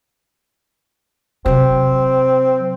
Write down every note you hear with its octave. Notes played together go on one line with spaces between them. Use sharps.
C3 F#3 C4